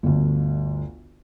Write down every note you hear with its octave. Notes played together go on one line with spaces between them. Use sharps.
G1 D2